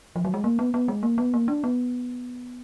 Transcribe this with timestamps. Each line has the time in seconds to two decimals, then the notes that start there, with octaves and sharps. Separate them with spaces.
0.16 F3
0.25 F#3
0.34 G#3
0.44 A#3
0.59 B3
0.74 B3
0.88 G#3
1.03 A#3
1.18 B3
1.34 A#3
1.48 D4
1.64 B3